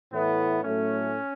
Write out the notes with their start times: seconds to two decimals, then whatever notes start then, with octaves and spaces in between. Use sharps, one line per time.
0.12 A2 E3 A3 B3
0.63 A2 F#3 A3 C#4